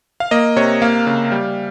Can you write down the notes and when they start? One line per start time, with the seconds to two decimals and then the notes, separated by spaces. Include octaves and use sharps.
0.20 F5
0.31 A#3 D#5
0.56 C3 C#5
0.82 A#3 F5
1.07 C#3
1.32 G3